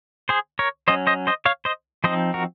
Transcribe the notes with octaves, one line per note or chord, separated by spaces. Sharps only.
G#4 C5
A#4 C#5
F#3 C#4 C5 D#5
C5 D#5
C5 D#5
C#5 F5
C5 D#5
F3 C4 D#4 C5 D#5
F#4 A#4